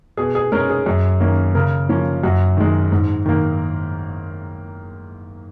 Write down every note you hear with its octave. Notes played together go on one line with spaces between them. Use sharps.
B2 G#4
G#4
G#3 C#4 A#4
G#4
F#2
D#3 A#3 C#4
C#3 A#4
F3 A#3 C#4
F#2 F#4
D#3 G#3
G#2
D#3 A#3